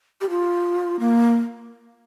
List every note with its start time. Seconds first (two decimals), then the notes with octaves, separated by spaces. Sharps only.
0.21 G4
0.30 F4
0.99 A#3